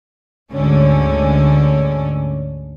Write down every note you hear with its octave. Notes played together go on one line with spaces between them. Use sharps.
D2 G#2 D3 C#4